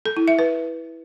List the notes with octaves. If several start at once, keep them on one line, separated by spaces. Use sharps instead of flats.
A4
E4
E5
B4